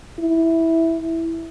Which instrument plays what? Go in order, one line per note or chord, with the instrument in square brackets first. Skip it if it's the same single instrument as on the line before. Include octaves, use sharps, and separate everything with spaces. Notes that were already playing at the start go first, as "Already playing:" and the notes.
[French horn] E4